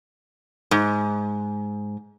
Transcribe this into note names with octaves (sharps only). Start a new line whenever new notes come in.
G#2